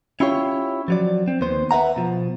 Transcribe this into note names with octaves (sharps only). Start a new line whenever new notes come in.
C#4 E4 F4 G4 C#5
F3 F#3 D5
C4
D#2 B3 C5
B4 E5 F#5 A#5
B2 F3